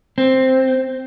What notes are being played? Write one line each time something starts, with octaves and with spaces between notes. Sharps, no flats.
C4